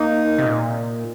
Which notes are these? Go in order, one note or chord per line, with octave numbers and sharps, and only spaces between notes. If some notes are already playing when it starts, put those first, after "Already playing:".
Already playing: A#3 D#4
C3
A#2